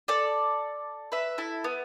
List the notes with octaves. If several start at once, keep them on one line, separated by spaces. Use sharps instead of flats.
A4 D5
B4 E5
E4 A4
B3